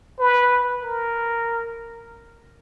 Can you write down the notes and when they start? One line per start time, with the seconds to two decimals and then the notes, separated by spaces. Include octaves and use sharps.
0.19 B4
0.82 A#4